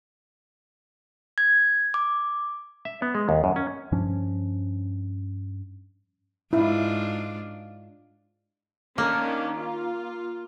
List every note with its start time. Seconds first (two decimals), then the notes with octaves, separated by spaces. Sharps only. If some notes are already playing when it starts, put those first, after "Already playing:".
1.38 G#6
1.94 D6
2.85 E5
3.02 B3
3.15 G#3
3.29 D#2
3.44 F#2
3.56 C#4
3.92 G2 F3 C#4 D4
6.53 G#2 D4 E4 F4
8.98 D#3 A#3 C#4 D4
9.55 F4